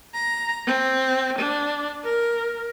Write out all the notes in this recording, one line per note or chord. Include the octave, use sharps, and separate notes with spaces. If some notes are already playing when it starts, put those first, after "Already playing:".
A#5
C4
D4
A#4